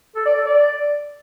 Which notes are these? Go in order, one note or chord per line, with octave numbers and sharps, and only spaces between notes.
A4
D5
A4
D5